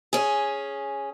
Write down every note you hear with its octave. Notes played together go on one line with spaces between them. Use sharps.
C#4 G#4